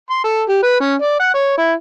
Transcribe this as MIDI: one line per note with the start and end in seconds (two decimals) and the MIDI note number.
0.10 0.23 84
0.24 0.42 69
0.48 0.59 67
0.63 0.78 71
0.81 0.94 61
1.02 1.18 74
1.20 1.33 78
1.34 1.54 73
1.58 1.73 64